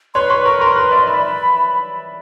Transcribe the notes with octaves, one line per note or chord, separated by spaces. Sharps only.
B4 C#5 C6
B4 C#6
A#4 C#6
A#4 C6
B4
D5 E5
D5 E5 B5